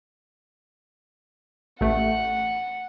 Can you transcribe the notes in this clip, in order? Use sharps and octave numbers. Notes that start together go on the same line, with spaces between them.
A1 A3 F#5